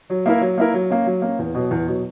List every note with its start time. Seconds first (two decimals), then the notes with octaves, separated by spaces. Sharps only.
0.10 F#3
0.26 A#3 E4 A#4
0.41 F#3
0.58 A#3 E4 A#4
0.74 F#3
0.90 A#3 C#4
1.06 F#3
1.22 A#3 C#4
1.39 E2
1.55 B2 F#3
1.71 E2
1.87 B2 F#3